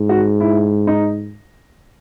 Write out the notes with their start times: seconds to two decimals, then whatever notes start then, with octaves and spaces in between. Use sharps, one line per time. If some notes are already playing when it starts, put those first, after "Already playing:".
Already playing: G#2
0.09 F#4
0.40 E4
0.87 D#4